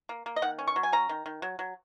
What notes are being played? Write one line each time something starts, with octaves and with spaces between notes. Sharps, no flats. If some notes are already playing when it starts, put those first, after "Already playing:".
A#3
A#3
D#5
D#3 F#5
C#4
C#6
F#3
G#5
C#4 A#5
D#3
D#3
F#3
F#3